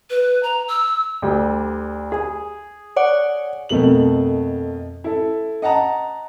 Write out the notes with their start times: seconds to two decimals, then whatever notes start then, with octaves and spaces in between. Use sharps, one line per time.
0.10 B4
0.43 A#5
0.69 E6
1.22 D2 G3
2.12 G#4
2.96 C#5 D5 F#5
3.69 F2 B2 A3 A#3 F#7
5.04 E4 A4
5.62 D#5 F#5 A5 A#5